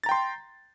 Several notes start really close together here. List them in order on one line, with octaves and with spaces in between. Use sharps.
A6 A#5 G5 C6